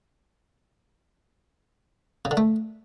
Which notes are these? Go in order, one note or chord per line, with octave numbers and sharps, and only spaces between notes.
C#3
D3
A3